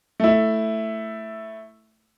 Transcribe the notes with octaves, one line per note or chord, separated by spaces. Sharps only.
A3 E4